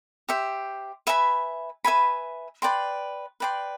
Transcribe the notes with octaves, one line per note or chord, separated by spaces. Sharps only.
G4 C5 E5
B4 E5 G#5 B5
B4 E5 G#5 B5
B4 D5 G5 C6
B4 D5 G5 C6